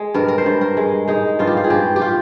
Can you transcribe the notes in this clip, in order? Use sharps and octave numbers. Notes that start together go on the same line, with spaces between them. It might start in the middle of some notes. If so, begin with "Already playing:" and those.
Already playing: G#3
G2 A#4
A#4
C5
G2
A#4
G#3
G#3 D#4
G2 F4
G4
F4
G#4
G2 G4
G4
F4